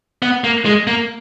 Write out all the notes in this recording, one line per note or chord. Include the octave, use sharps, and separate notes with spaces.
B3
A#3
G#3
A#3